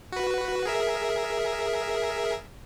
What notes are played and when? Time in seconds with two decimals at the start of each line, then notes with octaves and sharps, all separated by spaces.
0.12 F#4 B4
0.66 G#4 A#4 E5